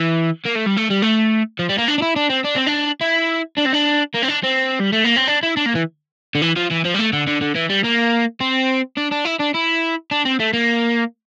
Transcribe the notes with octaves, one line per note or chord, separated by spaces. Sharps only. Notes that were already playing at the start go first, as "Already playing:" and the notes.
Already playing: E3
A#3
A3
G3
A3
G3
A3
F3
G3
A#3
D4
D4
E4
D4
C4
D4
C4
D4
E4
D4
C4
D4
A#3
C4
D4
C4
G3
A3
A#3
C4
D4
E4
D4
A#3
E3
D3
E3
F3
E3
F3
G3
A3
D3
D3
D3
E3
G3
A#3
C4
D4
D4
E4
D4
E4
D4
C4
A3
A#3